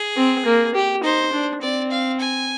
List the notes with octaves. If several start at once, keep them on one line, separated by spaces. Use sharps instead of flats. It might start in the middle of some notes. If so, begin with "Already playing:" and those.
Already playing: G#4
C4
A#3
G4
D#4 C5
D4
C4 D5
F5
G#5